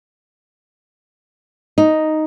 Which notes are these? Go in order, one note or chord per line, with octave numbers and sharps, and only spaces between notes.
D#4